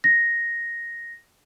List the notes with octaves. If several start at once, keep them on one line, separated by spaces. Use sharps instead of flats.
A#6